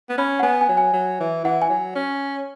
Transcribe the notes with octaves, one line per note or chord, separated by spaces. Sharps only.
B3
C#4 B5
F#5
B3 G#5
G#5
F#3
G#5
F#3
E3
E3 F#5
G#5
F#3
C#4